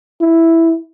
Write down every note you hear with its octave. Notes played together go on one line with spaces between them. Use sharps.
E4